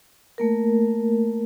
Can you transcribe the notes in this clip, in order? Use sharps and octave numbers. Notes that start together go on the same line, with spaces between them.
A3 A#3 A#4